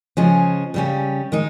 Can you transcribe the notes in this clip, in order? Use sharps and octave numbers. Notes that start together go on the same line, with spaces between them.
C#3 F3 G#3 C#4 G#4
C#3 G3 C#4
D#3 G#3 D#4